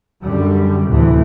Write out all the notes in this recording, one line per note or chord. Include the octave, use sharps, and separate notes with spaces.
F#2 D3 G3
D2 A2 C3 E3 A3